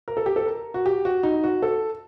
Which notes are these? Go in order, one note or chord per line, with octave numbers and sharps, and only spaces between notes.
A#4
A4
G4
A4
A#4
F#4
G4
F#4
D#4
F#4
A4